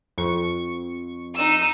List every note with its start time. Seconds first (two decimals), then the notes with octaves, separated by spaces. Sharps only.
0.18 F2 C#6
1.35 D#4 E6